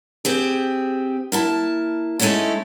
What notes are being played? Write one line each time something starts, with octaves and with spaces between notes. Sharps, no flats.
C4 G4 G#4
A#3 E4 A5
G#3 A3 C4 C#4 D#4 E4